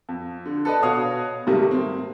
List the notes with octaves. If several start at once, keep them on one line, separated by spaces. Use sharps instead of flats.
F2
D3
A4 B4 D5 D#5 A5
B2 F#4 C#5 F5 D#6
G#2 C3 D#3 G3 A3
A#3 C4